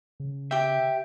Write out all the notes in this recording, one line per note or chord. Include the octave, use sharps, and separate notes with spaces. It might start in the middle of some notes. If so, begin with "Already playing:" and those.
C#3
G4 E5 G5